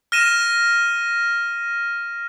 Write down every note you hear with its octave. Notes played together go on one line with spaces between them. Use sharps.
F6 A#6 D#7 E7